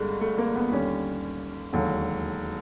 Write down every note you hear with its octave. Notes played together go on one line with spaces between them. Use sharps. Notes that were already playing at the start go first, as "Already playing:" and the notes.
Already playing: G1 G2 D3 G#3
A3
A#3
B3
D#2 D3 G3 C#4
E1 D#2 D3 F#3